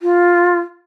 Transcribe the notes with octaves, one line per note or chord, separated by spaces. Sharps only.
F4